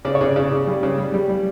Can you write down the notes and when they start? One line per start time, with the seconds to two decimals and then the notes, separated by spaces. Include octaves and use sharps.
0.05 C#3 D5
0.15 C#5
0.21 C#3 D5
0.36 C#3 D5
0.51 C#3
0.67 G3
0.83 C#3
0.98 G3
1.14 G3
1.29 G3